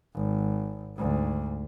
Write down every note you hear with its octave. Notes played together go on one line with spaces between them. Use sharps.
G#1
D2 G#2